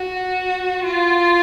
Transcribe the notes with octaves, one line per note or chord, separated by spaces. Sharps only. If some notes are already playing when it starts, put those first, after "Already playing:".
Already playing: F#4
F4